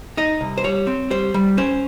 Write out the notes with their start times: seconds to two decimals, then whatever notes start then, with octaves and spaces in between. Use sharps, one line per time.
0.17 D#4 D#5
0.41 C2
0.58 C5
0.64 G3 C#5
0.87 C4
1.11 G3 C5
1.34 G3
1.57 C#4 C5